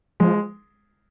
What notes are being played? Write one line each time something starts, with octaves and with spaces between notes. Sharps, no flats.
F3 G#3